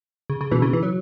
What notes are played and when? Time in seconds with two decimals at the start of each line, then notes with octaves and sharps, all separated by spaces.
0.30 C#3
0.41 C#3
0.51 B2 E3
0.62 C#3
0.73 E3
0.83 F#3